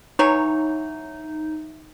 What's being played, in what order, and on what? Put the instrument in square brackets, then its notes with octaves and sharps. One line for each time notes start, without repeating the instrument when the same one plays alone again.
[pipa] E3 F#3 C#5 [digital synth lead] D#4